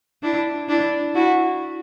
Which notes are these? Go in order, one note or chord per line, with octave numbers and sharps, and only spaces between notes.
D4 E4
D4 E4
E4 F#4